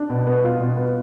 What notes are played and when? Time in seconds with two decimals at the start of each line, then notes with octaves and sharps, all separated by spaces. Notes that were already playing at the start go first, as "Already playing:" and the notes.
Already playing: D4
0.10 B2
0.27 B3
0.44 F4
0.60 B2
0.77 B3